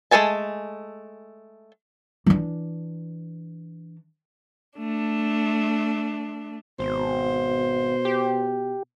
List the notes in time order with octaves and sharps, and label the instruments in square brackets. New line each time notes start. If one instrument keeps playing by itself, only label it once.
[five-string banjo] G#3 A3 A4 G#5 A5
[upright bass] E3 D4
[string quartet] A3 D4
[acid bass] G#1 [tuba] B2 [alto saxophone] C5
[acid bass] G4